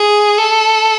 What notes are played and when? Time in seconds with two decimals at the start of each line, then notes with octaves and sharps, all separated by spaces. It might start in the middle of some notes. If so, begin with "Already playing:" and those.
Already playing: G#4
0.38 A4